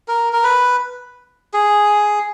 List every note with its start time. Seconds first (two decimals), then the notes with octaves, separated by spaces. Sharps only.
0.08 A#4
0.33 A#4
0.44 B4
1.54 G#4